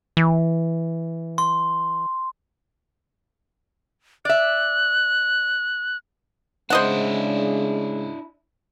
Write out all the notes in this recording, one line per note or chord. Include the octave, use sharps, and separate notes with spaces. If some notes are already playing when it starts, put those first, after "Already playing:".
E3
C6
D5 E5 F#6
C#3 G#3 D4 E4 C5 D#5 F#5